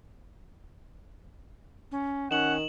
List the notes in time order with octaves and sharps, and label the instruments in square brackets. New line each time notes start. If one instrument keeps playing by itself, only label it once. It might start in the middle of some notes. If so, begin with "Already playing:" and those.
[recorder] C#4
[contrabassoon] D#3 [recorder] C#4 [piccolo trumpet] F#5 [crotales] E7 F#7